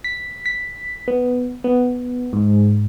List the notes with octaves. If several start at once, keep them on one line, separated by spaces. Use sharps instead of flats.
B6
B6
B3
B3
G#2